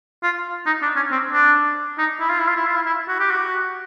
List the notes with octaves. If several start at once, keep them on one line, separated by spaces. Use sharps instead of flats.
F4
D#4
D4
C#4
C4
D4
D#4
E4
F4
E4
F4
E4
F4
E4
E4
F#4
G4
F#4